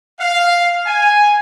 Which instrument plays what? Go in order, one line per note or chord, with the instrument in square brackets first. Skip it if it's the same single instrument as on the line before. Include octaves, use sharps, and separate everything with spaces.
[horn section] F5
G#5